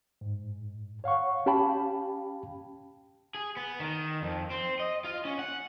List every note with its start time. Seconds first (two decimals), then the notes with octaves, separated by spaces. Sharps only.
0.21 G#2
1.04 C#5 F5 F#5 C#6
1.46 C#4 G4 F5 G5 A5 B5
3.35 G#4
3.57 B3
3.80 D#3
4.22 F2
4.50 C4
4.79 D#5
5.04 F4
5.25 C#4
5.39 F#5